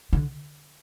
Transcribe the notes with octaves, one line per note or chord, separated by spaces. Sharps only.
D3